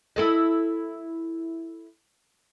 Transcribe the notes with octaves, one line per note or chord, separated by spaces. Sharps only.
E4 A4 D#5